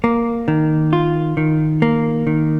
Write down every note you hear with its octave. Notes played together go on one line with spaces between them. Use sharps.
A#3
D#3
F4
D#3
A#3
D#3